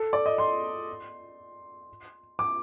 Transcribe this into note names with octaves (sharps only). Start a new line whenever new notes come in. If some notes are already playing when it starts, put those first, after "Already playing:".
Already playing: A4
D5
D#5
C6
D6